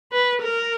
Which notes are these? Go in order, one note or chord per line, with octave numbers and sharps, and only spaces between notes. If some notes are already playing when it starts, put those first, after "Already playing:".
B4
A#4